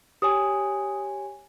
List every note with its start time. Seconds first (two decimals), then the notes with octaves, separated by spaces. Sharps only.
0.22 G4 C#5 G#5 D#6